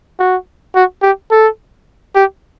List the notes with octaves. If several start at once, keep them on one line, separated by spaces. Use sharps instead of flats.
F#4
F#4
G4
A4
G4